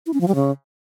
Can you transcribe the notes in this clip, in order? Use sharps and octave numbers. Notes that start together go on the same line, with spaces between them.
E4
C#4
F3
G3
C#3